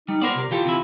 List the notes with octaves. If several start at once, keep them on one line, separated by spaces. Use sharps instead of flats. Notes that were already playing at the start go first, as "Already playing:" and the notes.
G3 D#4
B3 A#4 C5 D5
C3
E3 F4 G4 A4
C3 E3 E4